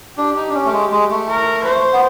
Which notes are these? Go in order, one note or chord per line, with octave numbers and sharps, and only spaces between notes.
D4 G4
D#4
D4
C#4
A3
G#3
G#3
A3
A#4
C5
B3